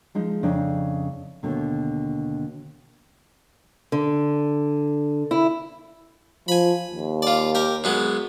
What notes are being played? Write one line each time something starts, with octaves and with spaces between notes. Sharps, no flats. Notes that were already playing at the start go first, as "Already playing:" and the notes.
F3 G#3 D#4
F2 C#3 D4 D#4
D#2 B2 D3
D3
E4
F3 G#5 B5
D#2
F4 D5
G4 A#4
F#2 G#3 B3